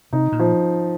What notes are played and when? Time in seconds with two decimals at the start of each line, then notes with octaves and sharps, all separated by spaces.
0.13 C3 D#4
0.32 A#2
0.39 F3